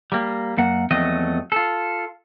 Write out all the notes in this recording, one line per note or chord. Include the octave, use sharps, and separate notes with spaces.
G3 A#3
F#2 A#3 F#5
E2 F3 F#3 A3 C4 D#5
F4 A4